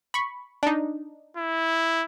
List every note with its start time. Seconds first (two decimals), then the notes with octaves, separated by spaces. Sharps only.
0.14 B5 C#6
0.63 D4 D#4
1.37 E4